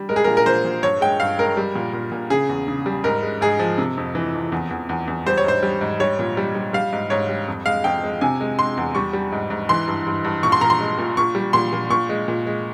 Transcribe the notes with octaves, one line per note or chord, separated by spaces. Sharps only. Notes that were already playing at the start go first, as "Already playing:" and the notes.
Already playing: G3
G#3 A#4
G#4
A#2 A#4
A#4
A#2 C5
A#2
G2 C#5
G#3 G5
G2 F5
G#3 A#4
G3
A#2
A#2
A#2
C#3 G#4
E2
C#3
G3
G#2 A#4
G#3
G#2 G#4
F3
C3
F2
E3
F2
E2
E2
E2
E2
G3 C5
C#5
G#2 C5
G3
G#2
G3 C#5
A#2
G3
G3
G3 F5
G#2
G#2 C#5
G3
F2
G#3 F5
F2 G5
G#3
C3 G#5
G#3
G#3 C6
E2
G3 C#6
G3
G#2
G#2
E3 C6
G2
G2
G2
A#2 C#6
C6
A#2 A#5
C6
G#3
A#2
A#2 C#6
G3
A#2 C6
A#2
A#2 C#6
G#3
A#2
G#3